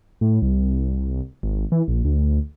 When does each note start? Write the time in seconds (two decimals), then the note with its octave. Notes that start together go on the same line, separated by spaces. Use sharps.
0.21 A2
0.42 C2
1.43 G#1
1.72 E3
1.88 A#1
2.05 D2